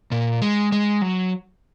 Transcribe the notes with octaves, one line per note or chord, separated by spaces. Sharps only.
A#2
G#3
G#3
F#3